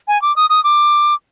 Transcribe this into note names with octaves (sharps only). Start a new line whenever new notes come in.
G#5
D6
D#6
D#6
D6